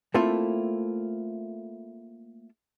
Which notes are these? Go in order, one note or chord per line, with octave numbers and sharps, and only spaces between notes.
A3 A#3 C4 E4 F4 A4